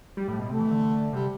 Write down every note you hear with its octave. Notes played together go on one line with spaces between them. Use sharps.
G3
A2
B2
C3 A3
E3
D3
C3 G3